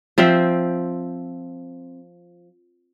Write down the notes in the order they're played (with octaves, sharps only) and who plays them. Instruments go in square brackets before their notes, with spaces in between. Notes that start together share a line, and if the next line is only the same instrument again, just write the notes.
[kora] F3 C4 E5 G5